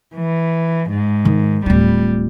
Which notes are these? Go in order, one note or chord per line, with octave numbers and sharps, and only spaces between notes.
E3
G#2
D#3
D1 G3 F4